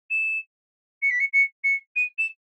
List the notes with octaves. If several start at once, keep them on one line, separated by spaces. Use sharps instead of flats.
E7
C#7
B6
C#7
C#7
C#7
D#7
E7